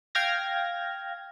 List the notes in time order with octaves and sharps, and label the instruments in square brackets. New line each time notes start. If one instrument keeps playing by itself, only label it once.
[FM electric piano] F5 G5 F6 G#6 A#6